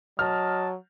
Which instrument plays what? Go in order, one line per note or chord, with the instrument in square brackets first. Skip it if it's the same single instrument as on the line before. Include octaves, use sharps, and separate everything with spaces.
[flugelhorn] F#3 [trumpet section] D#5 A5 [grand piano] F6